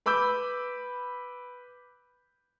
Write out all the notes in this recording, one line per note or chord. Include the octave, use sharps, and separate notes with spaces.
B4 B5 D6 E6 G6